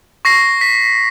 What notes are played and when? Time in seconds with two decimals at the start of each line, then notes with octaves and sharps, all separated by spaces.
0.25 C#6 A#6 C7
0.61 B6